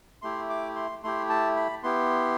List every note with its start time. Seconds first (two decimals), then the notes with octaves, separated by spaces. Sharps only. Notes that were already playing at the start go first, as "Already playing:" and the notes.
0.22 A3 E4 G4 C6
0.50 D6
0.76 C6
1.03 A3 E4 G4 C6
1.29 A5
1.56 B5
1.83 B3 E4 G4 C6